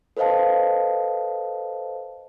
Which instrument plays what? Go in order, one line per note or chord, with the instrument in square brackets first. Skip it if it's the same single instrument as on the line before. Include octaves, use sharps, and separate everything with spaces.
[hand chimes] A4 B4 C5 D#5 F5 A5